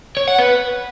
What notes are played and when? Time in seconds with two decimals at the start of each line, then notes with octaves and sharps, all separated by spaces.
0.17 C#5
0.28 F#5
0.38 B4